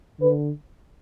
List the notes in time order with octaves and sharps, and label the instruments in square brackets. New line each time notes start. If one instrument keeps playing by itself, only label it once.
[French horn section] D3 B4